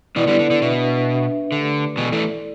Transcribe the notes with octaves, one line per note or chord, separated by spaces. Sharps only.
B2 E3 B3 E4 B4 D5
D3 G3
D3
D3
B2 D4 B4 E5
D4 B4 E5
D3 A3 G4 B4 D5
B2 E3 E4 A4 D5
E3 A3